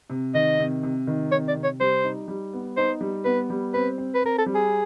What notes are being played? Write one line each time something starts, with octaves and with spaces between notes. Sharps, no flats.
C3
D#3 D#5
C3
C3
D#3
C3 C#5
D5
C3
C#5
G3 C5
D#4
G3
B3
D#4 C5
G3
B3 B4
G3
C4 B4
C4
B4
C4 A#4
A4
G3
G#4